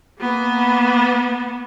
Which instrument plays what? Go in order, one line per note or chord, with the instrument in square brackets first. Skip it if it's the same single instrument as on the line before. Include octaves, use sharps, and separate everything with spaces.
[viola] A#3 B3